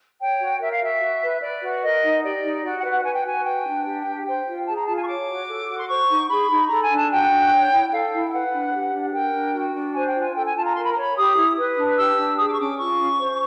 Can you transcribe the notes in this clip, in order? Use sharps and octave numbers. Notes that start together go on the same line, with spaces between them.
C#5 G5
F#4
A#4 E5
F5
F#4 E5
F#4
B4
B4 D5
F#4
A#4 D#5
D#4
G4 D5
D#4
F#4 D5
F#5
B4
F#5
B4 G#5
G5
F#4 G#5
B4 G5
D4
G4
D4
C5 G5
F4
G#4 A5
A#5
F4 A5
G#5
C#6
C#5 D6
F#4
A4
F#4
C6
C5 C#6
D#4
G#4 B5
D#4
A4 A#5
G#5
D4
A5
F#4 G5
D4
C#5
E4
A4 F5
E4
G5
B4 F#5
D4
G4
D4
A#4 G5
D4
F#4
D4
C5 G#5
G5
F4
G#5
A4 G5
G#5
F4 A5
A#5
A#4 C6
B5
A#5
C#5 B5
G4 D#6
E4
B4
D4
G4 E6
D4
G#4 D#6
D6
C#6
C#4 D6
F4 C#6
C#4
C5